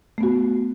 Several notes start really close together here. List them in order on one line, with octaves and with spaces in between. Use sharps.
A3 B3 F#4